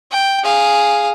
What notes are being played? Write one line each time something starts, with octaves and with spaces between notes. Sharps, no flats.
G5
G#4 F5